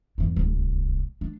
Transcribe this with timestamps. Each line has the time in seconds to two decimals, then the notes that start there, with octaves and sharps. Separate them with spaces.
0.18 E2 G2
0.36 D1 C2
1.21 D4